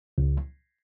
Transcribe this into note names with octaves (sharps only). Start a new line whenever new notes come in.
C#2